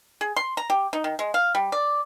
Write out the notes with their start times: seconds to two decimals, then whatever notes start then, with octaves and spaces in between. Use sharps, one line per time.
0.21 G#4
0.36 C6
0.57 A#5
0.70 G4
0.93 D#4
1.04 D#3
1.19 G#3
1.34 F5
1.55 G3
1.72 D5